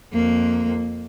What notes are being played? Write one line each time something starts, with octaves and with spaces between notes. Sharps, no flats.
F2 A#3